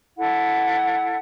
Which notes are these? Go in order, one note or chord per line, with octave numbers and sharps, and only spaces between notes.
E4 A4 F#5